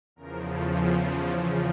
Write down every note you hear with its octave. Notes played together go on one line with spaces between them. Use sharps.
E2 C#3 F3 A#4
A4